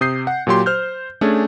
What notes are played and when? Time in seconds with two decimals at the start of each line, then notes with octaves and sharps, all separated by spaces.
0.01 C3 D#6 G6 C7
0.27 F#5
0.47 A#2 F#3 G4 C6
0.66 C5 F6 G6
1.21 A3 C#4 D4 G#4